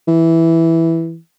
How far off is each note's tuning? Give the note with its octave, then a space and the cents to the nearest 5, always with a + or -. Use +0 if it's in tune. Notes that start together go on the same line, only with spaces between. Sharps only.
E3 -5